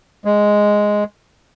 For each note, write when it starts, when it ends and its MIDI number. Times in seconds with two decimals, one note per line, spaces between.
0.25 1.04 56